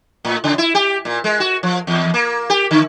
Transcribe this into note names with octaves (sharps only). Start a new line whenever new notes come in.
A2
C#3
E4
G4
A#2
G#3
F#4
F3
E2
A#3
G4
D3